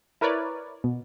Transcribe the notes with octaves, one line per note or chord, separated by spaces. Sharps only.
E4 A#4 B4 C#5 D5
B2